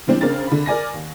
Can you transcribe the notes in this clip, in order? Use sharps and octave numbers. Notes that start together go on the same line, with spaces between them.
E3 G3 C4 D4
C#3 C4 D4 A#4 A6
D3 B5
A#4 D5 G#5 A#6
D#2